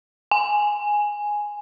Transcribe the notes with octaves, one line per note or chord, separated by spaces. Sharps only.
G#5